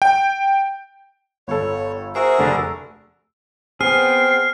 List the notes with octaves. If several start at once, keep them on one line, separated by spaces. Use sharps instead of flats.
G5
G1 A4 C#5
F#4 G#4 A#4 C5 E5 E6
F1 D3 E6
B3 C4 G#4 F6 C7